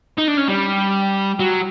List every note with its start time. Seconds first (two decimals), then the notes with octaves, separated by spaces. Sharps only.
0.18 D#4
0.28 D4
0.37 C#4
0.48 G3
1.40 F#3